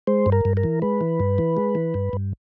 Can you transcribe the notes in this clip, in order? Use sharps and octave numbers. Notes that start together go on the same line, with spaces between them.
G#3 C5
G2
A#4
G2
A#4
E3
G#3 B4
E3
G2
E3
G#3
E3
G2
G2